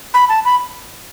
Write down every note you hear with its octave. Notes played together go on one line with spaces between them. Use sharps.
B5
A5
B5